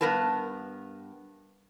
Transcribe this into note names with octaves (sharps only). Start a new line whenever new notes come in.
G2 B3 A#4 B4 A5